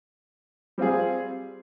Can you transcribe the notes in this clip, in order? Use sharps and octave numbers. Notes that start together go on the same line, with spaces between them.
G3 C4 F4 G#4